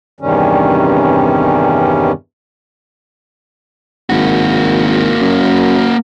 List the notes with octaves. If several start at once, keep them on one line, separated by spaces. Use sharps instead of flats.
E2 G2 C3 D#3 G3 C#4
G#1 A#3 F#4
F#2